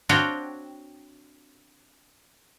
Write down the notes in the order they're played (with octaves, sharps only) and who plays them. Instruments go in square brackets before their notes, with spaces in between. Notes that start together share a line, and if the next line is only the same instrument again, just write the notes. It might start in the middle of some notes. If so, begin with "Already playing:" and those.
[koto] C4 D4 F#4 C#5 F5 G5